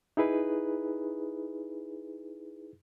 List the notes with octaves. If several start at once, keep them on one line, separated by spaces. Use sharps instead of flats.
D#4 E4 G#4 B4